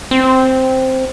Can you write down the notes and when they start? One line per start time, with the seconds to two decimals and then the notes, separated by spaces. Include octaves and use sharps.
0.11 C4